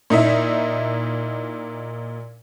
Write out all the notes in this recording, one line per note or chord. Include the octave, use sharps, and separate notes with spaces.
A#2 D#4 E4 E5